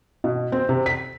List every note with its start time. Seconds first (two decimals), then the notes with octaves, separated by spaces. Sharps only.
0.24 B2
0.52 C4
0.69 C3
0.86 B6